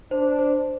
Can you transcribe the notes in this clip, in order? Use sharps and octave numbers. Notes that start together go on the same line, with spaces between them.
D4 C5
C5